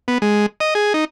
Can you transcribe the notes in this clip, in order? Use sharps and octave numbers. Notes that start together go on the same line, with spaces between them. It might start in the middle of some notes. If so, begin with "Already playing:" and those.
B3
G#3
D#5
G#4
D#4